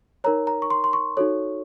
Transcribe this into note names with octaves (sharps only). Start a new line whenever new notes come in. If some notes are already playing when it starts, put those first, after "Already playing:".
D#4 A#4 C#5 A#5
A#5
C#6
C6
C6
C#6
D#4 F#4 A4 C#5